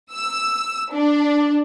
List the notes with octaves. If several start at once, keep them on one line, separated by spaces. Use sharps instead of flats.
E6
D4